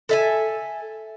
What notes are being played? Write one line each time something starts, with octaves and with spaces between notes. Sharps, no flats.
A4 E5 G#5